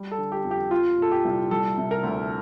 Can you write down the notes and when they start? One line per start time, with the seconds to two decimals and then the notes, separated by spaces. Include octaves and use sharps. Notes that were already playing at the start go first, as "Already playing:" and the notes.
Already playing: G3
0.11 A4
0.18 D3
0.32 G4
0.44 F2
0.51 G4
0.71 F3 F4
0.98 A#2 A4
1.12 G4
1.25 C2
1.51 G3 A4
1.78 C3
1.91 A#4
2.03 D2